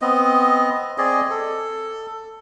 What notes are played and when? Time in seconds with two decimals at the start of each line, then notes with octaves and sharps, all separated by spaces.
0.02 B3 C4 D#5
0.98 C4 G#4 D5 D#5
1.30 A4